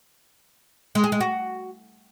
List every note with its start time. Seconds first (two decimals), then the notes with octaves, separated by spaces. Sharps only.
0.95 G#3
1.04 G#4
1.12 G#3
1.20 F#4